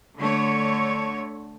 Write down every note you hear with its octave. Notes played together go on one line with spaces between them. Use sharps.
D3 A3 C#5